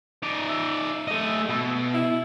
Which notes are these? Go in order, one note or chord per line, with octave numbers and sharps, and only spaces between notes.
D#4 D5
E5
A3 D#5
B2
E4